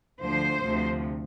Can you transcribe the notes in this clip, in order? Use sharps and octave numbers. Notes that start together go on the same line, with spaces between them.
D2 D3 F3 C5
D2 C3 F3